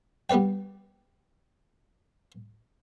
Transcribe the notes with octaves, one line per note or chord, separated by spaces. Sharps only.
G3 B3 B4 D5 G5